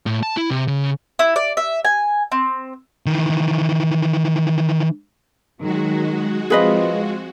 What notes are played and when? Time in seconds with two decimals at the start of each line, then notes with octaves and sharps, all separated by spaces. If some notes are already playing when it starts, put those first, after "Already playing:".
0.06 A2
0.23 A5
0.37 E4
0.50 C3
0.68 C#3
1.19 E4
1.36 D5
1.57 E5
1.85 G#5
2.32 C4
3.06 D#3 E3
5.60 D#3 F#3 G#3 F#4
6.50 F3 C4 F4 G#4 B4 D#5